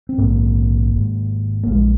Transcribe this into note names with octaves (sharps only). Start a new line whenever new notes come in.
C4
A#1 G#2 A#3
G#1 G#2
A#3
A#1 A#2 G#3